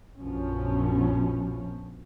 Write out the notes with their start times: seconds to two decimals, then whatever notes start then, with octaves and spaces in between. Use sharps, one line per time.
0.18 A#1 F#2 F3 B3 C#4